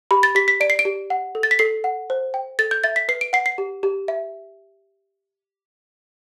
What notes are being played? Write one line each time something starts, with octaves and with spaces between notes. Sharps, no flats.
G4 B5
A6
G4 B6
B6
D5 D7
C7
D7
G4
F#5
A4
A6
B6
A4 C7
F#5
C5
G5
A4 A6
G6
E5 A6
B6
B4 C7
D7
F#5 C7
C7
G4
G4
E5